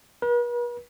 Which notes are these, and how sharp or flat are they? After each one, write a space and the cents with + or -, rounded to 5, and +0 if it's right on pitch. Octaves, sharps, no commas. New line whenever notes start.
B4 -45